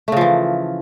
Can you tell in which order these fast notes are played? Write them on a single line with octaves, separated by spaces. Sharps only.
A3 C#3 F3 E3